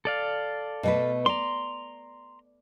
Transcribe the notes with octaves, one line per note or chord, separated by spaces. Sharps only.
A4 D5 F5
B2 A3 B4
D5 A#5 C6